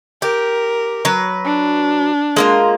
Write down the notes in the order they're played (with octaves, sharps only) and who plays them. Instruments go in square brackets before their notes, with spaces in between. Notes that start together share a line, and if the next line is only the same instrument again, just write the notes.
[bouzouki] G4 [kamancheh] A#4
[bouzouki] F#3 B4
[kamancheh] D4
[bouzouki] G#3 A#3 F4